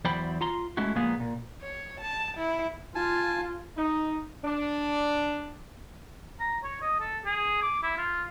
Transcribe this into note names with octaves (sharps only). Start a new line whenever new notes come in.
E2 F#3 C5 D5 G5 B5
F4 A#5 C6
G#3 A3 C#4 E4 F#4
A#2 F3 G#3 A#3 B3 G#4
A#2
C#5
A5
E4
F4 G#5 A5
D#4
D4
A#5
C#5
D#5
A4
G#4
D6
E4
F4